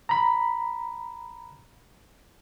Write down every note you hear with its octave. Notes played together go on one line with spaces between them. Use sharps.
A#5 B5